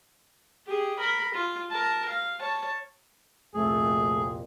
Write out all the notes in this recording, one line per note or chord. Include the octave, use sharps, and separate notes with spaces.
G4 G#4
A#4 B5
F4
A#4 A5
F5
C#5 A5
C2 F2 A#2 A3 G#4